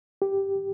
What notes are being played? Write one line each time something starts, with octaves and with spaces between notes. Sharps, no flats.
G4